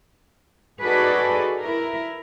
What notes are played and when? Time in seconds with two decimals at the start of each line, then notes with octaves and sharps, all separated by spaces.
0.82 D#4 F#4 G#4 A4 B4 D5
1.62 E4 A#4